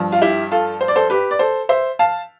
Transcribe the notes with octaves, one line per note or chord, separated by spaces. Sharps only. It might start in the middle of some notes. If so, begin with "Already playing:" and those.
Already playing: G2 F3
F4
E4 G4
F4 A4
C5
D5
A4 C5
G4 B4
D5
A4 C5
C5 E5
F5 A5